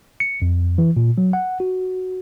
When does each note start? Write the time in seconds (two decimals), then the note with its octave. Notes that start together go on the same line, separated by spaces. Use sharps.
0.20 C#7
0.42 F2
0.78 E3
0.97 A#2
1.18 F#3
1.33 F#5
1.60 F#4